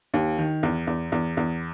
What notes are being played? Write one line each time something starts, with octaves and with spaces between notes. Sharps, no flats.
D#2
D#3
E2
E2
E2
E2